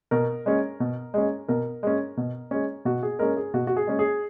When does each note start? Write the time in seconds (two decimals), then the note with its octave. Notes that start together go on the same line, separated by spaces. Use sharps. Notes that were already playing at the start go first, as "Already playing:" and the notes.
0.11 B2 A#4
0.46 G#3 C#4
0.80 B2
1.14 G#3 C#4
1.48 B2 A#4
1.83 G#3 C#4
2.17 B2
2.51 G#3 C#4
2.85 B2 F#4
3.03 G#4
3.19 G#3 C#4 A#4
3.37 G#4
3.54 B2 F#4
3.67 F#4
3.77 G#4
3.87 G#3 C#4
3.99 G#4